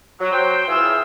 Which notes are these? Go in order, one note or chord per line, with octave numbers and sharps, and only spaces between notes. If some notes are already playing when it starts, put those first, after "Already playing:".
F#3
F#3 C5 G5
E3 F4 G#4 E6